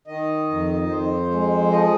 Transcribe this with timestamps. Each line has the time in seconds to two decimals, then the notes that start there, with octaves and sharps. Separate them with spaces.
0.07 D#3 D#5
0.49 F2
0.89 F2 C5
1.30 G#3
1.71 F3 D#5